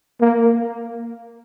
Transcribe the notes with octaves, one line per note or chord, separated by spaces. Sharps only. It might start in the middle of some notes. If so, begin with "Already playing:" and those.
A#3